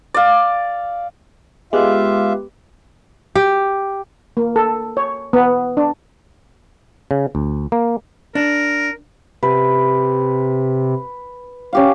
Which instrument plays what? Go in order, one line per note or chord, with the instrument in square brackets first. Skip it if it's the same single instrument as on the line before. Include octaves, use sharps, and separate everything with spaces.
[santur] D5 F5
[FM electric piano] G#3 [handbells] B3 G4 B4 [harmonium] F4 E5 F5
[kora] G4
[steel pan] A#3
A4
C#5
B3
D4
[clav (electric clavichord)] C#3
D2
A#3
[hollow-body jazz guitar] D4 [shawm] A#4
[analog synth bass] C3 [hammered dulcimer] B4
[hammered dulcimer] C#4 G4 F5